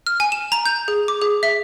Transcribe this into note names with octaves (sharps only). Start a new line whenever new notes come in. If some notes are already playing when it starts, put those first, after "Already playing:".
F6
G#5
E7
A#5
G6
G#4
D6
G#4
E5